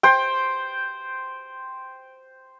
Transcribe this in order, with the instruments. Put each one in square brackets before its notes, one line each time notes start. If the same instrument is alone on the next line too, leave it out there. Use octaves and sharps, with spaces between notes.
[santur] C5 G5